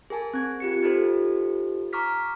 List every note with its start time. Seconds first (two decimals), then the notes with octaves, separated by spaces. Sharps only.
0.10 G#4 A#4 G#5 A5
0.34 C4 G#6
0.60 F4 G4 C#7
0.83 D#4 F4 G4 A4 C5
1.93 A#5 C#6 D6 F6 B6